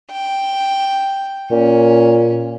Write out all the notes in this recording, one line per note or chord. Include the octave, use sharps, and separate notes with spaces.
G5
A#2 C#4